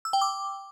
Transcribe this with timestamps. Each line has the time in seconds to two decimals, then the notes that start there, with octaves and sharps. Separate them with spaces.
0.05 E6
0.13 G5
0.21 D6